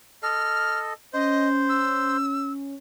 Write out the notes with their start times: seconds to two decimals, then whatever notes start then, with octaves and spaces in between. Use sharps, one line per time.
0.23 A4 D#5 F6
1.13 C#4 C5 D#5
1.69 E6